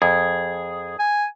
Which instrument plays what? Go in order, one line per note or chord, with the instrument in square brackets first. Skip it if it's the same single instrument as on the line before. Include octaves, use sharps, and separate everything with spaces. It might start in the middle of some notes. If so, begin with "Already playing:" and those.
[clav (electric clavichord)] F2 [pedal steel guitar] G#4
[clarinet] G#5